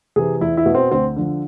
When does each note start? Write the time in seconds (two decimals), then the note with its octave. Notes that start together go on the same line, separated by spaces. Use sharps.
0.16 C3 E3 G#4
0.41 E2 E4
0.57 E4
0.66 B2
0.75 C4
0.91 D2 C4
1.16 D3 F3